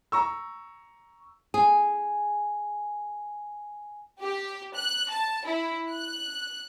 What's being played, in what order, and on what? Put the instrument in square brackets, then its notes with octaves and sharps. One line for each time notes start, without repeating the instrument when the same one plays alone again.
[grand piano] A#5 C#6 E6
[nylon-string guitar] G#4 [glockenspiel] G#5
[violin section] G4
F#6
A5
E4
F#6